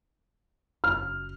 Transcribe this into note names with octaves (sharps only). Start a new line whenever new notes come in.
F#1 F6